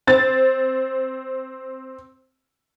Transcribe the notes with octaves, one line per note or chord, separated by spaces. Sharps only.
C4 A6